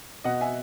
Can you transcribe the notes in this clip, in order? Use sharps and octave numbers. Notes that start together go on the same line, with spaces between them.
B2 D#5 F#5
E5 G#5